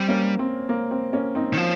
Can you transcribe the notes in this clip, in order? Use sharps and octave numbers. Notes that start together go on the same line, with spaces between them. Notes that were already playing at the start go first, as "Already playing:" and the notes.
Already playing: G3 C4
A#3 C#4
C4
A#3
C4
A#3 C#4
C4 D#4
D#3
F3